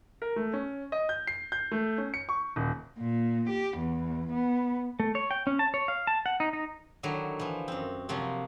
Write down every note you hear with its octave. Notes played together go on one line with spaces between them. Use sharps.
A#4
A3
C#4
D#5
G6
C7
G6
A3
C#4
C#7
C#6
D#1
A#2
G4
E2
B3
A3
C#5
G5
C#4
A5
C#5
F5
A5
F#5
D#4
D#4
D3 D#3 F#3 E4 A#5
E3 F3
F#2 C4
C3 F3 F#3 A#3